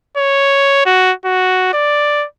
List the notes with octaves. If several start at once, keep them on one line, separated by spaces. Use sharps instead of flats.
C#5
F#4
F#4
D5